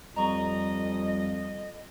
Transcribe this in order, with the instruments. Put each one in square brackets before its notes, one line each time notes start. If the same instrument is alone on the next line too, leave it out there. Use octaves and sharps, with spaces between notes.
[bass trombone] F2 [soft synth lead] G3 [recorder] D#5 [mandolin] A#5 C#6